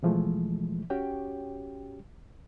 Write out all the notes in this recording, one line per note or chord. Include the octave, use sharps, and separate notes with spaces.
B2 E3 F3 G#3 A3
C#4 F#4 G4 C#5 G5